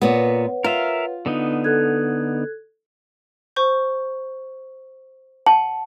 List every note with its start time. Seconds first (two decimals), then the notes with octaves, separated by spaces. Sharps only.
0.02 A#2 B3 B4 C#5 F#5
0.64 F4 A#4 E5 F5
1.26 D3 B3 D#4
1.64 A4 F#6 G#6
3.56 C5 C#6 G6
5.46 F#5 A5 F#7